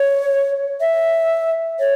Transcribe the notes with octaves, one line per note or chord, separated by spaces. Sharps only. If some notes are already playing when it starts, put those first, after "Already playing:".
Already playing: C#5
E5
C#5